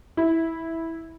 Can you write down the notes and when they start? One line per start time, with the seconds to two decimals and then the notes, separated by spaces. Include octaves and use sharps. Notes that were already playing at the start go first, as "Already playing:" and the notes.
0.17 E4